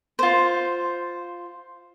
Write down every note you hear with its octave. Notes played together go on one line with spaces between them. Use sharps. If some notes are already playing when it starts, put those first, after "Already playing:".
F4 C5